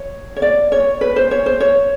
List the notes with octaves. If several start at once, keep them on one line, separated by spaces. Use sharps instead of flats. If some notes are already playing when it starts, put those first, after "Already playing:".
Already playing: C#5
C#5
D5
C#5
B4
C5
C#5
C5
C#5